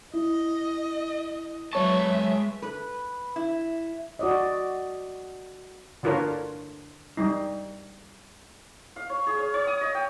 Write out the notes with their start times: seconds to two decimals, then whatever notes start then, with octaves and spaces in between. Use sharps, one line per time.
0.14 E4 D#5
1.73 F#3 G#3 B4 C#5 E5 A5 C#6
2.62 B4
3.36 E4
4.19 F#4 D5 D#5
6.03 D3 D4 F4 A#4 B4 C#5
7.17 G3 D#4
8.96 F5
9.10 C#5
9.27 G#4
9.38 C#5
9.54 C#5
9.67 D#6
9.81 D#5
9.95 G5